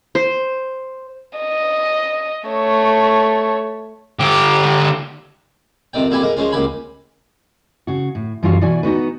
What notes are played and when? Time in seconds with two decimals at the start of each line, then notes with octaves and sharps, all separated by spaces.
0.15 C5
1.39 D#5
2.48 A3 C#5
4.19 D3 G4
5.93 F2 C3 D#3 D5 G5
6.10 F2 A#2 E4 G4 G#5 B5
6.22 G#2 D#4 A#4
6.37 F3 G#3 C#4 F4
6.52 C#2 A#2 G4 G#5 B5
7.87 C#3 F#4
8.15 A2
8.43 F#2 E3 G3 F4 F#4 F5
8.61 B2 E3 F#4 D5 G#5
8.83 B3 D#4 F#4 B4